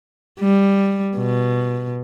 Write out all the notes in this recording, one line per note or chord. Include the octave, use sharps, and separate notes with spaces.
G3
B2